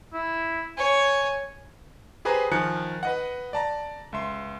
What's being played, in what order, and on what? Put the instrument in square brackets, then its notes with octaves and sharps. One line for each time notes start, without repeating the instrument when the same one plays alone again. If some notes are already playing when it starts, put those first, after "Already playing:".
[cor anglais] E4
[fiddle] C#5 [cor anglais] G#5
[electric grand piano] G4 G#4 B4 C5 G#5 A#5
D#3 F3 G#5 A#5 F#6 C#7
B4 D#5 F#5
D5 A5 A#5
C#2 E5 C6